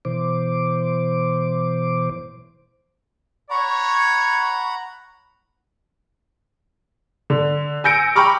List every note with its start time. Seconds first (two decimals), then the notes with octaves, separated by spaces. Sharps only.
0.05 B2 E3 C5 D6
3.50 C#5 F#5 A#5 B5 C#6
7.30 D3
7.84 G#5 E6 G6 A#6 C#7 D7
8.15 G5 A#5 B5 C#6 D6 F6